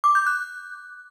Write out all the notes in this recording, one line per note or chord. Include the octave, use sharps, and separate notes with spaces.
D6
G6
F#6